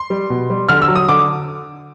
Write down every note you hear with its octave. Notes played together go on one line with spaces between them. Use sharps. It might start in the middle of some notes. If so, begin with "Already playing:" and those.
Already playing: C6
G3
B2
G3
D3 F6
E6
F#3
D#6
D3 D6